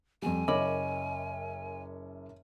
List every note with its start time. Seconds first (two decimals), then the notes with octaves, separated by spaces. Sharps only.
0.22 F2 G3 G#5
0.48 F#1 F#2 C#4 D#5 B5 D6